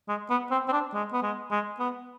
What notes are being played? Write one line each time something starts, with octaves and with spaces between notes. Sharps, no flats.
G#3
B3
C4
C4
D4
G#3
B3
G#3
G#3
B3